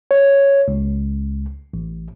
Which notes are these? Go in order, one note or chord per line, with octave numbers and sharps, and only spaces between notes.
C#5
C#2
A1